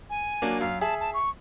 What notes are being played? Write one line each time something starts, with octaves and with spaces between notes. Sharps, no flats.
G#5
F#3 A#3 D4
F#2 F5
G#4 E5 A5
A5
C#6